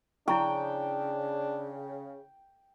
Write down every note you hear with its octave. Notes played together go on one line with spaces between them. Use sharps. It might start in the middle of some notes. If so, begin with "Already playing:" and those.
C#3 D4 E4 G5 A#5 C#6